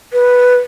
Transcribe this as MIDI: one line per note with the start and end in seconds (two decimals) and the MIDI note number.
0.13 0.58 71